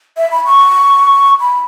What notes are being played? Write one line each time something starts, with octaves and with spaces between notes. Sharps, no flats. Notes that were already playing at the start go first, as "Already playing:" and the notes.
E5
B5
C#6
B5